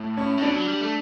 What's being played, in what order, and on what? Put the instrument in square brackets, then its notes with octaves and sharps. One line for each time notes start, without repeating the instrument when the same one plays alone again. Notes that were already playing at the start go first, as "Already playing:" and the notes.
Already playing: [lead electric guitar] A2
[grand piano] C#4
[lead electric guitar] A2
[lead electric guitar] B2 [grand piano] D4
[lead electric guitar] F#3
G3
A3